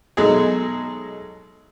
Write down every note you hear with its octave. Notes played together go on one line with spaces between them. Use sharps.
B2 F#3 G#3 A3 D#4 G#4